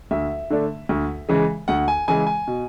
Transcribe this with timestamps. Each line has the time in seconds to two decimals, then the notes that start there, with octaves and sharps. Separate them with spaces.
0.11 D2 E5
0.50 D3 A3 D4
0.89 D2
1.29 C#3 E3 G#3
1.68 D2 F#5
1.88 G#5
2.08 C#3 E3 G#3 G#5
2.27 G#5
2.47 B2